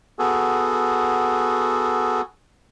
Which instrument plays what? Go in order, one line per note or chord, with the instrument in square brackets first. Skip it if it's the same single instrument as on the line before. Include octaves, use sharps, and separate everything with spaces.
[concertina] B3 F#4 G#4 A4